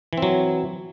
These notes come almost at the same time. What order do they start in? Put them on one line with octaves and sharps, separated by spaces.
E3 C4 F#3